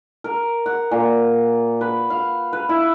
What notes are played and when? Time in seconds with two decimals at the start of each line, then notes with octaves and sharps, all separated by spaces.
0.24 A#4
0.66 F#5
0.91 A#2
1.81 B4
2.10 F5
2.53 B4
2.69 E4